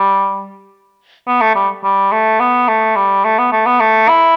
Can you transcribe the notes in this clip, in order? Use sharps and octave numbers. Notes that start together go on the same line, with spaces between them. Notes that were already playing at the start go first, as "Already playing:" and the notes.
Already playing: G3
B3
A3
G3
G3
A3
B3
A3
G3
A3
B3
A3
B3
A3
E4